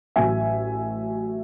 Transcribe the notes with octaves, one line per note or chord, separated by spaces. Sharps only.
A1 A2 F#3 E5 G#5